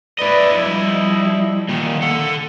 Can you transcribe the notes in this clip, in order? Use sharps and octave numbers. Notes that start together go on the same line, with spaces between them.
E4 B4 D5 D#5
F3 G3
A#2 D#3
A4 F#5